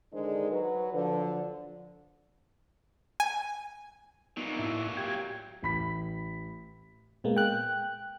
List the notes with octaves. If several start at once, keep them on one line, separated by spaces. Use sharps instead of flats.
D3 D#3 G#3 D4 D#4 C5
F#3 B4
D3 F3
G#5
A#2 F#3 B3 D#4
A2 E4 E5
G4 G5 G#6
A1 B5 B6
A#2 G#3 A#3 B3
G5 F#6